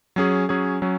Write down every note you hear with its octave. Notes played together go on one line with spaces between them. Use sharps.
F#3 C#4 G#4
F#3 C#4 G#4
F#3 C#4